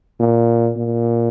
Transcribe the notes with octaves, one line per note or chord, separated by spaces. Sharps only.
A#2
A#2